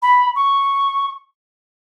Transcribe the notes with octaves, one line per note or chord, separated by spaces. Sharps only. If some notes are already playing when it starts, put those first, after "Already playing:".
B5
C#6